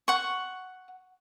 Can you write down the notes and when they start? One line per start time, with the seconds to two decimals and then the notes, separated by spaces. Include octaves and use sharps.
0.08 F#5 C#6